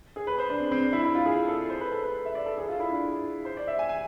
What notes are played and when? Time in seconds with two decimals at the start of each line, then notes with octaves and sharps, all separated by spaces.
0.16 G#4
0.27 B4
0.38 C5
0.49 D4
0.60 C4
0.71 C4
0.82 D4
0.93 E4
1.04 E4
1.15 F4
1.25 G#4
1.48 A4
1.70 C5
1.80 B4
1.92 A4
2.03 B4
2.25 E5
2.35 D5
2.46 A4
2.58 G#4
2.69 F4
2.80 E4
2.90 D4
3.45 C5
3.57 D5
3.67 E5
3.79 G#5
3.89 G#5